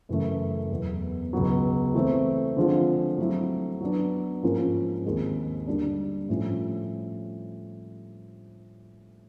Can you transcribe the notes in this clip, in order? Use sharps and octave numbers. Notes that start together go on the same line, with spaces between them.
F#2 C#3 E3 A3
E2 B2 F#3
C#2 B2 F#3
E3 A3 C4
D3 F3 G#3 C4 F4
F#3 A3 C4 E4
F#3 B3 D4
G#2 F3 A#3 C#4 F4
D#2 D#3 G#3 C4
D3 G3 A#3 D4
A2 F3 A3 C#4